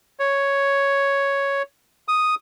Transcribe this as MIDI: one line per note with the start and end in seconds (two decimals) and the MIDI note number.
0.19 1.62 73
2.08 2.35 87